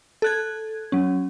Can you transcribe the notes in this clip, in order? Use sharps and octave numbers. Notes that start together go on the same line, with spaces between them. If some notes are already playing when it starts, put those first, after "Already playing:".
A4 F#6 G#6
F#3 C#4